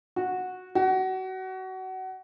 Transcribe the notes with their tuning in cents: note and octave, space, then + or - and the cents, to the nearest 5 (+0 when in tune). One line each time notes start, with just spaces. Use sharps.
F#4 -10
F#4 +25